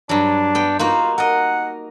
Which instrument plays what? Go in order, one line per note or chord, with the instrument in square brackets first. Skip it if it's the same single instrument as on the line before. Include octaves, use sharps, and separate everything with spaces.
[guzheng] G2 F#3 [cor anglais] D4
[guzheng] B3 G5
[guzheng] A#3 D#4 F#4 [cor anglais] F4
[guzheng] A#4 D#5 [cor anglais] F#5